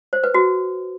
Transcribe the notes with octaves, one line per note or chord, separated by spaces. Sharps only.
C5
B4
F#4